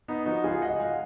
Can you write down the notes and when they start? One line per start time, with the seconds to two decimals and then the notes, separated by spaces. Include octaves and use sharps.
0.08 B3 D#4
0.26 F3 D#4 F#4
0.44 C#2 F4 G#4
0.62 C#2 D#5 F#5
0.79 G#3 F5 G#5